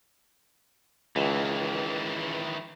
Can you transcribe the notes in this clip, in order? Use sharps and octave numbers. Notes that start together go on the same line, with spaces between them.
C#2 D#3 E3